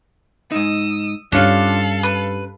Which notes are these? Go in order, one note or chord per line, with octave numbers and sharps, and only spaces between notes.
G#2 D#4 D#6 E6
G2 C#4 D4 F4 A4 C#5 F5
B4